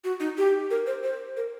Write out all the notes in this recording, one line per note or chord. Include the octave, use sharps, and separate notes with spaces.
F#4
D#4
G4
A#4
C5
C5
A#4